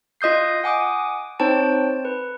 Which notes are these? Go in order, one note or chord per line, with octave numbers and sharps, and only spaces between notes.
F4 D#5 D#6 G6 C7
F#5 G#5 D6 D#6
C4 D#4 C5 C#5 G5 A5
B4